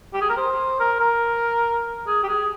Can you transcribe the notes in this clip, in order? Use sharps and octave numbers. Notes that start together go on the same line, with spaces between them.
G4
G#4
A#4
C5
A#4
A#4
G#4
G4
G#4